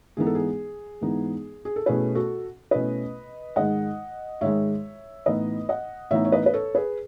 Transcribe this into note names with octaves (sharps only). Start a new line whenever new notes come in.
G#2 E3 B3 D#4 G#4
A4
G#4
G#2 E3 B3 D#4
G#4
A4
B2 A3 C#4 E4 G#4 B4
F#4 A4
B2 A3 C#4 E4 B4 D#5
G#2 D#3 G#3 D#5 F#5
G#2 D#3 G#3 C#5 E5
A2 E3 B3 D#4 B4 D#5
D#5 F#5
A2 E3 B3 D#4 C#5 E5
C#5
B4 D#5
B4
A4 C#5
G#4 B4